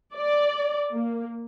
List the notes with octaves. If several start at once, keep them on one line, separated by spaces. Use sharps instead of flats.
D5
A#3